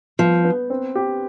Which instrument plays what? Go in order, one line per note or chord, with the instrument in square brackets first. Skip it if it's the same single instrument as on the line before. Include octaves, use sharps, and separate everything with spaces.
[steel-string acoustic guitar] F3 [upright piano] B3
[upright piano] B3
C4
G4